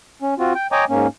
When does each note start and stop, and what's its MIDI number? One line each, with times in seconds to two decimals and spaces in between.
0.22 0.34 61
0.39 0.53 60
0.39 0.53 65
0.39 0.53 66
0.55 0.67 79
0.72 0.85 73
0.72 0.85 75
0.72 0.85 79
0.72 0.85 80
0.72 0.85 82
0.72 0.85 86
0.90 1.07 44
0.90 1.07 58
0.90 1.07 61